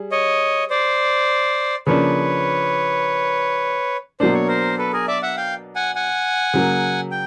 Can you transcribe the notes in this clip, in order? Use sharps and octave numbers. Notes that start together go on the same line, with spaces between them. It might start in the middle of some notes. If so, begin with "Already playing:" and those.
Already playing: G3 G#4
C#5 D#5
C5 D5
C#3 F3 A#3 D4 B4 C#5
B2 F#3 A#3 D4 C5
C#5
A#4 C5
A4 B4
G#4 A#4
D5 E5
E5 F#5
F5 G5
F#5 G#5
F#5 G#5
C#3 F#3 A#3
G5